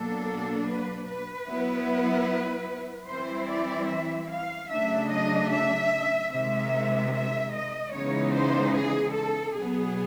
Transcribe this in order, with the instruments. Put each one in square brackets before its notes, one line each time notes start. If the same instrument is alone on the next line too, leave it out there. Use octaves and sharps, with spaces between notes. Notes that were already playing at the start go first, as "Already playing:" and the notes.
Already playing: [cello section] B2 F#3 A#3 D4 A4
B4
B4
F#3 B3 E4
E3 G3 C4 E4 C5
D5
E5
F5
C#3 F#3 A3 D4 E5
D#5
E5
C3 D#3 G#3 E5
E5
D#5
C#3 E3 G#3 B3 D#4 C#5
C5
G#4
A4
B2 F#3 B3 G#4